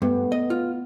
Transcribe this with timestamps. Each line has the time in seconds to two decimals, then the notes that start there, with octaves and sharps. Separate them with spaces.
0.02 G2 A3 B3
0.32 B3 D#5
0.50 F4